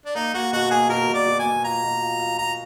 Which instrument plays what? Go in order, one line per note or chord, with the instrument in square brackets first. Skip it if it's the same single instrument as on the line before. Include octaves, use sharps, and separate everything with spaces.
[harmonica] D4
[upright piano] A#3 [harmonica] D#4
[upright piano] A#3 [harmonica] F#4
[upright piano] B2 [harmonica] F#4
[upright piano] A#3 [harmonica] G#4
[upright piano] B2 [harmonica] A#4
[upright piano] B2
[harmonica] D5
[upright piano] B2
[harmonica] G#5
[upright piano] B2
[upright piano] F4 [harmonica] A#5
[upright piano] B2
F4
F4
[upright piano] F4 [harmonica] A#5